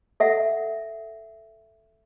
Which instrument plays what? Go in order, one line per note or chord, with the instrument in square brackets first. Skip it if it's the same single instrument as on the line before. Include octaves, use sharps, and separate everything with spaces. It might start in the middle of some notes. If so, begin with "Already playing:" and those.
[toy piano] A4 E5 F#5